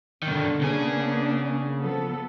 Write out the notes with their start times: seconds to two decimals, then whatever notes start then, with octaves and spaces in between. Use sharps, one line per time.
0.23 G2 B2 D3 D#3
0.61 C#3 A#3 B3 D4 G#4
1.80 F3 B3 A4